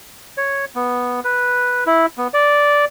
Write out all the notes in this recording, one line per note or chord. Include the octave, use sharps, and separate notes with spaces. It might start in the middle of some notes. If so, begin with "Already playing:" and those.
C#5
B3
B4
E4
B3
D5